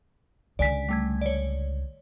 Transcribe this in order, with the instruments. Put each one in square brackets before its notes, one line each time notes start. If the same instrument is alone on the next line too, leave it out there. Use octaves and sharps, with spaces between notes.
[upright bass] C#2 D3 [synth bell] D5 G#5 B6
[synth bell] G3 A3 G#6
C#5 D5